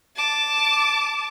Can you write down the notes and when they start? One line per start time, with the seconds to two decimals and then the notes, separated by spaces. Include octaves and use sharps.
0.16 A5 D6